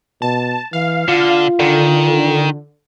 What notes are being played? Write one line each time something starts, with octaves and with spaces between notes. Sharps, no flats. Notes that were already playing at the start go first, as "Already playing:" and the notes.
B2 A5
E3 F5
D3 F4
D3 D#3